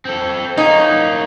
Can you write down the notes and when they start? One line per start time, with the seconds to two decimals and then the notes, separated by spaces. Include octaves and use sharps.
0.05 C4 A4
0.58 A#3 C#4 D#4